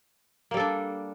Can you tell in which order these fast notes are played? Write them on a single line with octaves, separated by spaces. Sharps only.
A#3 G3 A4 D4